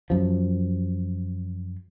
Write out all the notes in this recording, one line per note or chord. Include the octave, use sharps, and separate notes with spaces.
F#2 F3